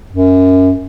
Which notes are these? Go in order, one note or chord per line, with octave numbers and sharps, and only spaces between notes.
F#2